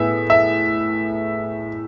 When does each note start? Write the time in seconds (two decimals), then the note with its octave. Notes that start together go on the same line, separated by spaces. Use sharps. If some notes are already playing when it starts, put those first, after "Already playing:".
Already playing: A2 B3 G#4 E5
0.30 E5